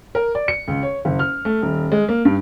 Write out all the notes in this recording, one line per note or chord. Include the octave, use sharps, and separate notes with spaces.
A#4
D5
C#7
C#2
C#5
F#1
F6
A3
D#1
G#3
A#3
G2